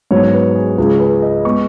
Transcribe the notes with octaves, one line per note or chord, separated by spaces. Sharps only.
G#2 F#3 B3 C#5
B4
G#4
C#2 C#3 G#3 C#4 G#4
B4
D#5
G#3 B3 C#6